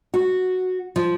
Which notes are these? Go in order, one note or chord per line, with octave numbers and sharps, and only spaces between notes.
F#4
F3